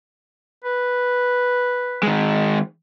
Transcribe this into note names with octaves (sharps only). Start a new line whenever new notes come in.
B4
D#3 G#3